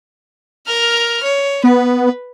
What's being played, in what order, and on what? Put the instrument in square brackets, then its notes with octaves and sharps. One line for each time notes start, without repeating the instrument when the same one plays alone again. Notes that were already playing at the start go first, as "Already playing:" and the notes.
[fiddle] A#4 F6
C#5
[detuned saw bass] B3 [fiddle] B4